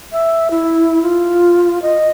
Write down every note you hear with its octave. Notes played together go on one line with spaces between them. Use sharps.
E5
E4
F4
D#5